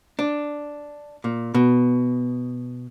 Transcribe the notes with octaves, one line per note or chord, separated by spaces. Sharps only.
D4
A#2
B2